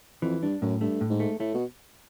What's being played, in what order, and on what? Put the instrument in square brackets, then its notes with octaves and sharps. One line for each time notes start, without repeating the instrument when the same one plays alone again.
[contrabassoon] F2 [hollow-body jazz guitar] E3
[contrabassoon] G2 [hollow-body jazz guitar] D4
[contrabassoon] F#2 [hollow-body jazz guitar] A2
[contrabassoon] G2 [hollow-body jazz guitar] A3
[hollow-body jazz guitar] A2
[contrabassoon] G#2
[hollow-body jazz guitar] A3
[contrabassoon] A2 [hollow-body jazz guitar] A3
[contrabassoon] B2